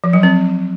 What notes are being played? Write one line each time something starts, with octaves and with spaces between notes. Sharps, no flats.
F3
F#3
C4